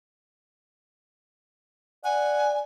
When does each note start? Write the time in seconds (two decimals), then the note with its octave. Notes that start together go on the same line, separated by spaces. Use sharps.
2.04 D5 F#5 G#5